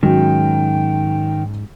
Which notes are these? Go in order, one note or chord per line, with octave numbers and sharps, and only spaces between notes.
G#2 D#3 F#3 G#3 C#4 F#4 G5